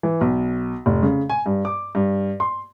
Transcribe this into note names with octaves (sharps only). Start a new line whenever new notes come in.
E3
B1
F1
C#3
G#5
G2
D6
G2
C6